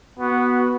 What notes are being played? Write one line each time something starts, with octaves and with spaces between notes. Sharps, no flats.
B3 F#4